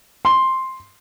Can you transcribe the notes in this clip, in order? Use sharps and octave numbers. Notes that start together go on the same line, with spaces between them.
C6